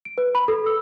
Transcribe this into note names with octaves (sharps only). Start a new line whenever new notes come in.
D7
B4
B5
A4
E6